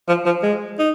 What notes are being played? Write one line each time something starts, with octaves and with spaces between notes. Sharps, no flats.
F3
F3
G#3
D#4